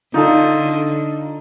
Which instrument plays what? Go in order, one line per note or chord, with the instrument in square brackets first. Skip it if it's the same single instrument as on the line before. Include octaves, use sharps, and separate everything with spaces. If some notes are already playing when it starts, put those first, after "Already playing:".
[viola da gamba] D3 [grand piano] D#4 F4 A4